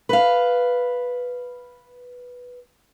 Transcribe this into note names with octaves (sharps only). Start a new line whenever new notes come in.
B4 F5